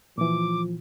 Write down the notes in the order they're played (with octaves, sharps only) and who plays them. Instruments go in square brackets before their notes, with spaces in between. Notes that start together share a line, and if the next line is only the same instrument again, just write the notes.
[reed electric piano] A#2 E3 [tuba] F3 [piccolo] D6